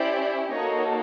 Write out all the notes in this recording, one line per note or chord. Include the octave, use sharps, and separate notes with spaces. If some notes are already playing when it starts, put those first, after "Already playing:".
Already playing: C#4 E4 G4 C5 D5
A#3 D#4 F#4 A4 C#5 D#5